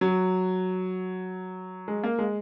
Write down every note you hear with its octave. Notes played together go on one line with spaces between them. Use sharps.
F#3
G#3
A#3
G#3